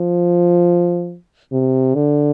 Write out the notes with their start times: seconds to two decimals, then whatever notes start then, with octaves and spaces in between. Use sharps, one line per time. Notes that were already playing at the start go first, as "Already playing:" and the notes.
Already playing: F3
1.52 C3
1.95 D3